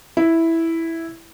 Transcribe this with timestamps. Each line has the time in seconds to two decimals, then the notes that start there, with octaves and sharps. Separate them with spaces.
0.17 E4